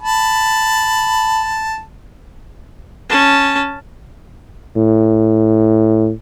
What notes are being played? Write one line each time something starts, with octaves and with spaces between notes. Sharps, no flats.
A5 B5
C#4 A5
A2